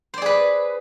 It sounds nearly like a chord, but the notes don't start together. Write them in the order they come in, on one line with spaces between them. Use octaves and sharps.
C5 D5 G#4 B4